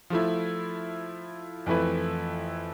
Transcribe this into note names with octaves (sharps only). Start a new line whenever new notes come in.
F3 A3 E4
F2 E3 A3 E4 B4